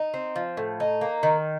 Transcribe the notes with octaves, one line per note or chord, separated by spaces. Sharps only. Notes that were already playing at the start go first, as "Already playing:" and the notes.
Already playing: D#4
C4
F3
A2
D#4
A#3
D#3